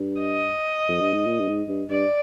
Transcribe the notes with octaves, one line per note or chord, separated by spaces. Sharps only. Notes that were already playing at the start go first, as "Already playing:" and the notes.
Already playing: G2
D#5
F2
G2
G#2
A#2
G2
G#2
G2
G2 D5